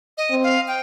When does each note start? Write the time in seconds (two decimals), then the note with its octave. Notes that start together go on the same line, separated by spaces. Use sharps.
0.18 D#5
0.30 C4
0.43 F5
0.68 G5